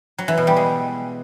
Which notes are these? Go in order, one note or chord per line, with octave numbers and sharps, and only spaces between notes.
F#3
E3
B2
G3
G#3